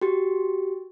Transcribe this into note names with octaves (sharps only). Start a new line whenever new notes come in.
F#4 G4